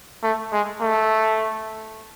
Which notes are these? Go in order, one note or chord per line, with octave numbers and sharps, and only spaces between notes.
A3
G#3
A3